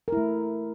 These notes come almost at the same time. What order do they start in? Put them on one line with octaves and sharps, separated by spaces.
A#4 E4 A3